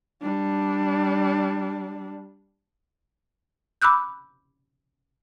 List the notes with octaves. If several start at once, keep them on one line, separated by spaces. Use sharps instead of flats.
G3 D4
B5 D6 E6 F#6 G6